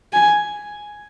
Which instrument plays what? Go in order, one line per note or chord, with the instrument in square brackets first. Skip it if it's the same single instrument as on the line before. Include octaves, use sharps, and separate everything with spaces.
[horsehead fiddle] G#5